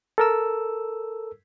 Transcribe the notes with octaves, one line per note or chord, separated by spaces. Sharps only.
A4 A#4 E6